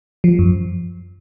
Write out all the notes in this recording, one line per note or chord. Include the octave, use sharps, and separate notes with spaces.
F3
F#2